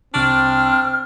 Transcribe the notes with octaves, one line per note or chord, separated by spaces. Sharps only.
C2 C3 C4 D4 C#6 F6